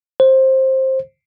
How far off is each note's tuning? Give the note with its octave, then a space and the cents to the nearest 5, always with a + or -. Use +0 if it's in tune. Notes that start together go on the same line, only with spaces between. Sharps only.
C5 +15